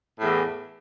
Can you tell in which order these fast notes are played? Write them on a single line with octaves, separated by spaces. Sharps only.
A2 E2 E3